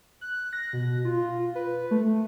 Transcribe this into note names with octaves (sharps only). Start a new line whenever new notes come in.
F#6
A#6
B2
F4
B4
A3